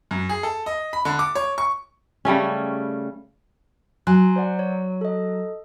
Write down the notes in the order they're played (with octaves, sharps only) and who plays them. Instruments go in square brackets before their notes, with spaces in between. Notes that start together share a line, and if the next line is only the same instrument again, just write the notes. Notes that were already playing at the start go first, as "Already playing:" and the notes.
[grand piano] F#2
G#4
A4
D#5
B5
D3
D6
C#5
C#6
[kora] C#3 G3 A3 C#4
[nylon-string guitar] F#3 [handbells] G#5 C6 F#6
[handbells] C5 D5 F#5
C#5
A4 D#5